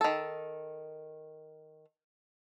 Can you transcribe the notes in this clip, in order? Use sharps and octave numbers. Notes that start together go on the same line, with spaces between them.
D#3 A4